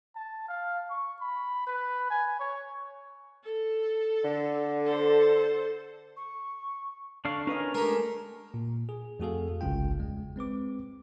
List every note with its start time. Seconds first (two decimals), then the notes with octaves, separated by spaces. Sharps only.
0.15 A5
0.48 F5
0.90 C#6
1.21 B5
1.67 B4
2.10 G#5
2.39 C#5
3.44 A4
4.24 D3
4.86 A4 C5
6.17 C#6
7.25 D3 D4 F5 C#6
7.47 C#4 D4 A#4 B4 D#5
7.74 G#3 A3 G4 A#4 A#5
8.54 A#2
8.89 G#4
9.19 F2 A3 F#4 G#4 A4 F5
9.61 G1 C2 C#3 G#3 F4 G5
9.99 E2 G#3
10.36 G#3 C4 B4 D6